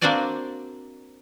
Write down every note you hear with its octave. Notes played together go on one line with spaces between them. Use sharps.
A#3 C4 D4 F#4 D5 G#5